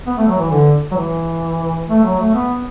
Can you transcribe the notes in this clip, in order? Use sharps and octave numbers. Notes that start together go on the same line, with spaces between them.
B3
A3
F#3
E3
D3
F#3
E3
A3
F#3
A3
B3